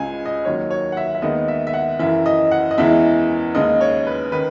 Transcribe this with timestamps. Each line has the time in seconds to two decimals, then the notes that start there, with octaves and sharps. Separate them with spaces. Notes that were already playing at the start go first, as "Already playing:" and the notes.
Already playing: C#2 C#3 G#3 G#5
0.26 D#5
0.45 D#2 D#3 F#3 C#5
0.70 C#5
0.92 F#5
0.97 E5
1.15 E5
1.22 D#2 D#3 G#3 B3 D#5
1.48 E5
1.67 E5
1.73 F#5
1.99 F#2 C#3 E3 E5
2.26 D#5
2.51 F#5
2.71 D#5
2.78 E2 C#3 E3 G#3 E5
3.55 D#2 C#3 G#3 D#5
3.81 C#5
4.07 B4
4.32 D#3 B4